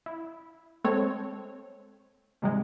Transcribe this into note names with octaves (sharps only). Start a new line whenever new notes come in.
E4
G#3 C4 A4 C5 C#5
G#2 C3 G3 G#3